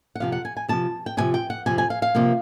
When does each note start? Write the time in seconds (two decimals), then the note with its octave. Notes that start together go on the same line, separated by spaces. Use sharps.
0.15 F#5
0.20 F2 C3 F3 F5
0.32 F#5
0.45 G#5
0.57 G#5
0.69 F2 C3 F3 A5
1.06 G5
1.17 F2 C3 F3 G#5
1.34 G5
1.50 F#5
1.66 F2 C3 F3 G#5
1.78 G#5
1.90 F5
2.02 F5
2.15 C3 F3 A#3